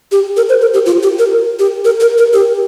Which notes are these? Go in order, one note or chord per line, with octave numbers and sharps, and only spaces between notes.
G4
A#4
C5
A#4
G4
F4
G4
A#4
G4
A#4
A#4
A#4
G4